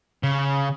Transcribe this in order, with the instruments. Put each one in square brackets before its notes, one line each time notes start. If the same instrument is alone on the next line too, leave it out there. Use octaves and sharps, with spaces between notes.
[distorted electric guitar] C#3